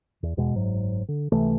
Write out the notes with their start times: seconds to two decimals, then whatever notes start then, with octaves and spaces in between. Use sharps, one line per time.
0.23 E2
0.37 E2 B2 G#3
0.55 F#1 G#2 F#3
1.08 D3
1.32 C#2 C3 E3 A3